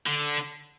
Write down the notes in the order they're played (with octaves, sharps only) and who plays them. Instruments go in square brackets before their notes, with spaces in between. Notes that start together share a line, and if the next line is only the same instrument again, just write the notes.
[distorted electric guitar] D3